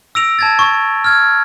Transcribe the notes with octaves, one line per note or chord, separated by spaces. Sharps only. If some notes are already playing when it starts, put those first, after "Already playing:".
E6 A#6 D7 F7
A5 G#6 A6
C#6
F6 G#6